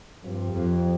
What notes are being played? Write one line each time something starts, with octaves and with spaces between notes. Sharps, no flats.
G2 F3 C4 G4
F2